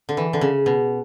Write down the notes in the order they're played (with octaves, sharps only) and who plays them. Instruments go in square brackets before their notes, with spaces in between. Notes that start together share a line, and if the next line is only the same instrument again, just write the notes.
[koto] D3
E3
D3
C#3
B2